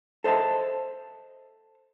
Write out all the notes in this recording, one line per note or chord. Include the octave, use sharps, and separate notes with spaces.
A4 C5 D#5 E5 A5